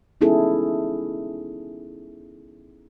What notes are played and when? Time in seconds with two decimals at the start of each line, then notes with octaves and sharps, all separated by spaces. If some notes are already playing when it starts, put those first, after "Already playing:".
0.21 B3 C#4 D#4 E4 G#4 A4